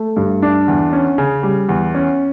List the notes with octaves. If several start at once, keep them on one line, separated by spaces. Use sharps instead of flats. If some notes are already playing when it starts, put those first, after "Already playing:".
Already playing: A3
G2
D4
E2
C#4
C#3
G3
E2
C#4